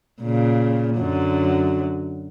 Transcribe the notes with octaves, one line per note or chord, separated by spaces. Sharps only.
A#2 C#3
F#2 D3 F#3